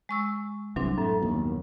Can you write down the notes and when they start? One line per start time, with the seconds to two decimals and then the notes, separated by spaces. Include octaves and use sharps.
0.09 G#3 C#6 E6
0.76 C2 C3 E3 F#3 D4 C6
0.98 F#2 A2 A3
1.22 A#1 D#2 B2